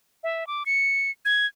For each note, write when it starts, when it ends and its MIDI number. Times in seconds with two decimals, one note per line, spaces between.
0.24 0.47 76
0.47 0.63 86
0.66 1.11 97
1.25 1.46 92